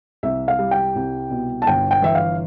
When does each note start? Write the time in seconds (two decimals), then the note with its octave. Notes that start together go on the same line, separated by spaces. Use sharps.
0.23 C2 E5
0.48 F5
0.59 G3
0.71 G5
0.96 C2
1.30 B2
1.62 A5
1.67 G1 G5
1.91 G5
2.02 E3 E5
2.15 F5